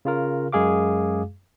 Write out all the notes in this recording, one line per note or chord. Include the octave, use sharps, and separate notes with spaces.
C#3 F4 A#4
F#2 G#3 G#4 F5 D6